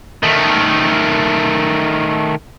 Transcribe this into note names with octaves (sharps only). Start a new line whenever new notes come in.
D#3 A3